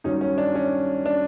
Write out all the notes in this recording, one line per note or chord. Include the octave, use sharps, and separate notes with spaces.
G2 D#3 F#3 C#4 D#4
C#4
D4
C#4
D4